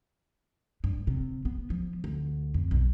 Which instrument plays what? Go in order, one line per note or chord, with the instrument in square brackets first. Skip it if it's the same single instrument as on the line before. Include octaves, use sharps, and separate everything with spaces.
[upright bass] G2
C3
B3
F3
D2
F2
B1